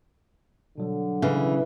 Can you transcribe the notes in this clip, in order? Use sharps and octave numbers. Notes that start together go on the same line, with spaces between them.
B2 D3 F#3 G3
C#3 E3